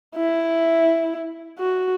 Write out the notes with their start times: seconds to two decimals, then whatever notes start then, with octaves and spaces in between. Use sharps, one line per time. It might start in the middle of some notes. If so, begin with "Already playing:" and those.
0.16 E4
1.59 F#4